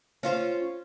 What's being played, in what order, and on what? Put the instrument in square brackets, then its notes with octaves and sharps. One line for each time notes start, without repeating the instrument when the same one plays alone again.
[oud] C#4 F4 C5